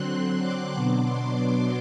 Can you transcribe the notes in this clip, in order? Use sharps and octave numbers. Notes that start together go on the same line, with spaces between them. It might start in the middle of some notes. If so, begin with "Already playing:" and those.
Already playing: D3 F#3 C4 C6 F#6
D6
B2 F#3 B3 D4
C6
D6